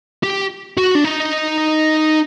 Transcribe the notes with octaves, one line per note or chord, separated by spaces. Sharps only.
G4
F#4
D4
D#4